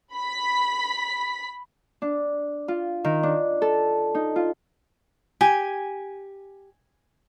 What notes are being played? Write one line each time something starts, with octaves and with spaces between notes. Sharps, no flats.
B5 B6
D4
F4
D#3
D4
A4
D#4
F4
G4 G#5